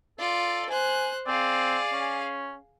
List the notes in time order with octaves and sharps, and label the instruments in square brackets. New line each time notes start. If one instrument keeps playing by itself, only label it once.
[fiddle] F4 D5 [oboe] A4
[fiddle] C5 F#6 [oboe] G#5
[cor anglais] C4 [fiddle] G#4 F5 [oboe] D5
[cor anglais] C#4